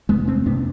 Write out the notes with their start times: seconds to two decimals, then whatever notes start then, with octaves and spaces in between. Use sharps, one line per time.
0.09 E2 G#3 B3
0.12 C3
0.28 A3 C4
0.46 F2 C3 B3 D4